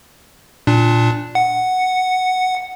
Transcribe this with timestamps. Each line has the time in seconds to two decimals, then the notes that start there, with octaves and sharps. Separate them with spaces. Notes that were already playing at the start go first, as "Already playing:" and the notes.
0.67 A#2 D4
1.35 F#5